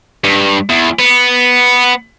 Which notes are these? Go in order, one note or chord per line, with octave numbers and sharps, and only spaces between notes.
G2
E2
B3